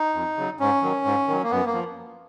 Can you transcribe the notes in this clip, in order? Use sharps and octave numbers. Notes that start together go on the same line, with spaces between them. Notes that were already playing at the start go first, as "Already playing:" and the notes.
Already playing: D#4
F2
C#3 F#3
G#2 C#4
D#3 F#3
G#2
D#3 F#3
A#3
F#2 B3
A#3
F3